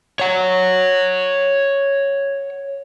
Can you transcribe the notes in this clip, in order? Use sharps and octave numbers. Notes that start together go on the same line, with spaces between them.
C#5 F#5